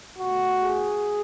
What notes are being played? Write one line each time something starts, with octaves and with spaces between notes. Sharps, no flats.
B2 A3 F#4
G#4